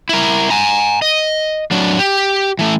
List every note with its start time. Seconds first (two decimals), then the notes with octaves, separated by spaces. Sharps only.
0.09 E4 A#4
0.50 G#5 A#5
1.02 D#5
1.71 F#3 D4
1.99 G4
2.59 E3 A3